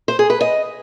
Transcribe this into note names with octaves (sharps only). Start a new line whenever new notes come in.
C5
G#4
B4
D#5